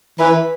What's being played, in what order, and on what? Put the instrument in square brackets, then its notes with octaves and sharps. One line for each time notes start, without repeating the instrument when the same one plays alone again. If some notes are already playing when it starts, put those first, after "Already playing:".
[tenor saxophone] E3 [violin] B4